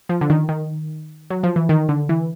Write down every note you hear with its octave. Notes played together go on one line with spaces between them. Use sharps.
F3
D3
D#3
D#3
F#3
F3
E3
D#3
D3
E3